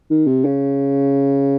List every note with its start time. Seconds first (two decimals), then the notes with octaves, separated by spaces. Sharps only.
0.10 D#3
0.27 C3
0.45 C#3